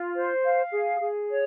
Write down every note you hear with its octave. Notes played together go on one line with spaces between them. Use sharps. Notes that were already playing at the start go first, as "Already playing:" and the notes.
Already playing: F4
C5
F5
G#4
G#4
C#5